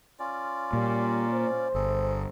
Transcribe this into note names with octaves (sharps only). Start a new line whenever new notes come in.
C#4 F4 D5
A#2 G3
C5
G1 G#4 A4